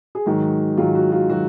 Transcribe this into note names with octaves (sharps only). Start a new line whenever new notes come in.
G#4
G#2 D#3 F#3 F#4
G#2 D#3 F#3 F4
F#4
F4
D#3 F#3 F#4